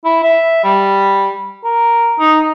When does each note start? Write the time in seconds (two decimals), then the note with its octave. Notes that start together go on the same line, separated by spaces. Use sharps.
0.05 E4
0.23 E5
0.64 G3
1.64 A#4
2.19 D#4